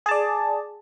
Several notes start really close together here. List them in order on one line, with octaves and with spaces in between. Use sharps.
G#4 A5 D5